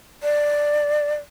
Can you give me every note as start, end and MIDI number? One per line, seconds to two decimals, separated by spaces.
0.23 1.15 74